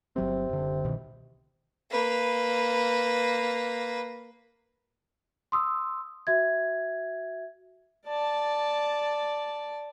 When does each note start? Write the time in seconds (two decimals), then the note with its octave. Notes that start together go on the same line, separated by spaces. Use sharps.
0.16 G1 C3 F#3 C4
0.49 F#1 D3
0.84 C2 B2 D#3
1.91 A#3 B4
5.52 C6 D#6 E6
6.27 F#4 E5 G#6
8.06 D5 A5